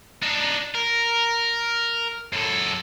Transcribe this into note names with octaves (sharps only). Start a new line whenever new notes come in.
D4 D#4
A#4
F#2 A4